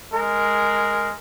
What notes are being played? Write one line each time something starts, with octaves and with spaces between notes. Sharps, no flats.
G#3 A#4